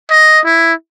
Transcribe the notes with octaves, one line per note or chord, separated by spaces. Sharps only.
D#5
E4